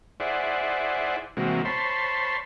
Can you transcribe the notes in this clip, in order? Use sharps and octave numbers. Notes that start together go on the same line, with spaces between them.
E4 G#4 C5 D5 F#5
C3 E3 G#3 A#3 C4 F#4
C5 C#5 A5 B5 C6